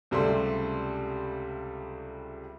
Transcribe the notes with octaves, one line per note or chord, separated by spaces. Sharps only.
C#2 C3 G3 A3 A4 C6